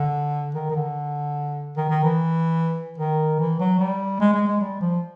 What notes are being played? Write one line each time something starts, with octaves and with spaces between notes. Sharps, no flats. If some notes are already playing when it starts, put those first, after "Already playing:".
Already playing: D3
D#3
D#3
D3
D#3
D#3
E3
D#3
E3
F#3
G3
G#3
G#3
G#3
G3
F3